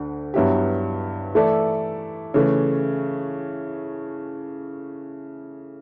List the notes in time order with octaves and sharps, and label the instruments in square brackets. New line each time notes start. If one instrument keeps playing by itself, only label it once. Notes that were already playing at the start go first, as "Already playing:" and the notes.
Already playing: [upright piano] D2 D3
G2 F#3 B3 E4 G4
E3 A3 E4 A4 D5
C#3 E3 A3